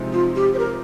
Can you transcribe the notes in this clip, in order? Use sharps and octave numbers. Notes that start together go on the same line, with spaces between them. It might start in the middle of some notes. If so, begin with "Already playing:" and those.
Already playing: C3 F3 G#3 C4 D#4
F4
G4
C5
A#4